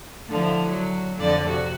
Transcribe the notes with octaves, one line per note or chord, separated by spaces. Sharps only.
D3 F3 E4
F#3
F2 D3 D5
C3 F#4